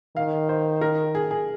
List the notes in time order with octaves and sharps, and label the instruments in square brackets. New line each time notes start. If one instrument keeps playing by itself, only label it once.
[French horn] D#3 [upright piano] F5
[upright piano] C5
A#4
G#4
G#4